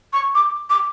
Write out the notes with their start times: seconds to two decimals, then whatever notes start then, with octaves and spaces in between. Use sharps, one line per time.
0.13 C#6
0.35 D6
0.70 D6